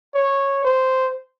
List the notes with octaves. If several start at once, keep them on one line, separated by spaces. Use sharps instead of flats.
C#5
C5